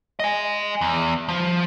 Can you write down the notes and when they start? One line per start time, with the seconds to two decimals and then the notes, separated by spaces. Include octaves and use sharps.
0.20 D#5 G#5
0.81 E2
1.29 F3